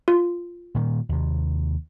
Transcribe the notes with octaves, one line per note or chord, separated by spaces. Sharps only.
F4
A#2 D#3 G3
D#2 C3